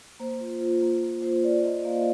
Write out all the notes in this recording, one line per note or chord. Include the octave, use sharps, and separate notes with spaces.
A#3 C5
F4
F4
A#3
A#3
F4 C5
F4 D5
A#3 D#5
A#3 F5